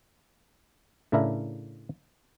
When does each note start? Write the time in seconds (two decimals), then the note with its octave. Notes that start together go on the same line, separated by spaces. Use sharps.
1.12 A2 C#3 D4 E4 A#4 E5